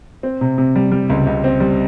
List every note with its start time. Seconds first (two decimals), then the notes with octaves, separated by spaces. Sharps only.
0.23 C4
0.41 C3
0.58 C3
0.75 G3
0.91 G3
1.10 C#2
1.27 C#2
1.44 C4
1.60 G3